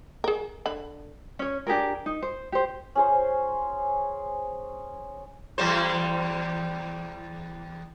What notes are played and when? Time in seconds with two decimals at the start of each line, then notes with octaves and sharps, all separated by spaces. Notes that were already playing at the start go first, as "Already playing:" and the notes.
0.24 G#4 A#4
0.66 D3 B5
1.39 C#4 C#5
1.67 D4 G4 G#4 A#4
2.06 D#4
2.22 C5
2.52 G4 C5
2.95 C#4 G#4 C5
5.58 E2 G3 C5